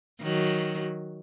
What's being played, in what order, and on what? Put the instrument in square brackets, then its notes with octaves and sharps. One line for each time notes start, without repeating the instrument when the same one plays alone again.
[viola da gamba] D#3 F#3